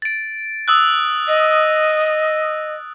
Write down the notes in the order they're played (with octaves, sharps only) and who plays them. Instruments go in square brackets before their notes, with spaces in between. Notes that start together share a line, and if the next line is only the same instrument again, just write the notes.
[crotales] A6 D7
D#6 E6 F#6
[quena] D#5